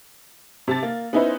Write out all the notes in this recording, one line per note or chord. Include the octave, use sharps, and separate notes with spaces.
C3 A5 A6
A#3
B3 C#4 D#4 E4 B4 C5